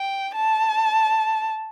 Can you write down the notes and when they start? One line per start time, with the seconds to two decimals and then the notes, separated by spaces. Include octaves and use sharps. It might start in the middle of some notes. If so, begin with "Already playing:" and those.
Already playing: G5
0.34 A5